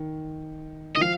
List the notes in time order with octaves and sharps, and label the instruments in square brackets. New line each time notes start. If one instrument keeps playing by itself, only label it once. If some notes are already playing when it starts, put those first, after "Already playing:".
Already playing: [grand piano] D#3
[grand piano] D#3 [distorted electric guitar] D#5
[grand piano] F3 [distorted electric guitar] F5